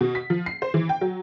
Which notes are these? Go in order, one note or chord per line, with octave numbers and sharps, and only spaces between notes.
B2
B6
F3
C7
C5
E3
G5
F#3